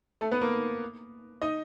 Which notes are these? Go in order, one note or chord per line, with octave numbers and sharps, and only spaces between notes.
A3 A4
B3 B4
A#3 A#4
D#4 D#5